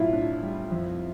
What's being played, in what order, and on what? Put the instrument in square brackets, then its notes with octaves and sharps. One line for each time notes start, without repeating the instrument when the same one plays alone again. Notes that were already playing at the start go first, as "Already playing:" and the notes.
Already playing: [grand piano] B1 A2 [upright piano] E4 F4
[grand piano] D4
G3
F2